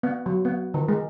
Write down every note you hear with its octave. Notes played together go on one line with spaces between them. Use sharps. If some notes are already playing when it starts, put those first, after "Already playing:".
B3
F#3
B3
D#3
G#3